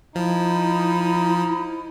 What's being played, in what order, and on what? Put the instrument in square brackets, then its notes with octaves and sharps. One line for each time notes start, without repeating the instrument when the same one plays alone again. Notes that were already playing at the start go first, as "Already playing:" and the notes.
[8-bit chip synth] F3 [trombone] D#4 [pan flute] E4